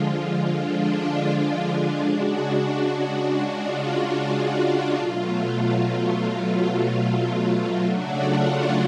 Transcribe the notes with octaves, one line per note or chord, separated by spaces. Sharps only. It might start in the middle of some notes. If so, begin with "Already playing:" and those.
Already playing: D3 F3 G#3 F4
D4
F4
D4
F4
C#3 G#3 D4 F#4
F4
D4
B2 F#3 A3 F4
F4
C#3 F#3 A3 D4 F#4
F4